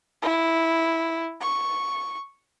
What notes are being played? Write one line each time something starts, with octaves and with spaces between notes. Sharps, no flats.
E4
C#6